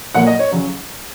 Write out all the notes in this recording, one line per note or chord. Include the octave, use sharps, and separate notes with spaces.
A#2 F#3 A#3 F#5
D#5
C#5
C#3 F#3 C#4